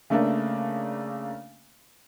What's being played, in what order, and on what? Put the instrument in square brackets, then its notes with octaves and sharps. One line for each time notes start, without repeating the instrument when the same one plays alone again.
[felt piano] C#3 A3 A#3 D4